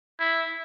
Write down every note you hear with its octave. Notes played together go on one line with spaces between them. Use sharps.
E4